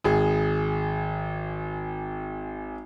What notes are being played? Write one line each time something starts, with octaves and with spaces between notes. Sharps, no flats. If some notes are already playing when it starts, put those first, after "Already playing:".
G#1 G#4